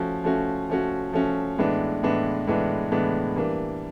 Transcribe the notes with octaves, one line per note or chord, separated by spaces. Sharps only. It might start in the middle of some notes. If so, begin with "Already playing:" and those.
Already playing: F3 A3 C#4 F#4
F3 A3 C#4 F#4
F3 A3 C#4 F#4
F3 A3 C#4 F#4
A2 E3 G#3 B3 D4
A2 E3 G#3 B3 D4
A2 E3 G#3 B3 D4
A2 E3 G#3 B3 D4
E3 G3 A#3 D4